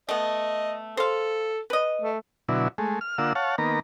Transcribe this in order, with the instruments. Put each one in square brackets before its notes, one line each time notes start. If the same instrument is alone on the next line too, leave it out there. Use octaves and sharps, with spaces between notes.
[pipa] A3 B3 [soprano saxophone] D#5
[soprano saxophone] A4 [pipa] C5 F5
[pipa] B4 D#5
[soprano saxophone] A3
[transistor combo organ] B2 D3 F#3 E4
G#3 A3
F6
D3 A#3 F4 F#5 E6
C#5 F5 F#5 A5
D#3 A#3 B3 A#5